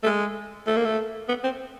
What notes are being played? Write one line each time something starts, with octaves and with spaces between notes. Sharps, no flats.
A3
G#3
A3
A#3
A3
B3
C4